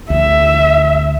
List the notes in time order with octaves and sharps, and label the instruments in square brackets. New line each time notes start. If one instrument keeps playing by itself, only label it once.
[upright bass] D2 [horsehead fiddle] E5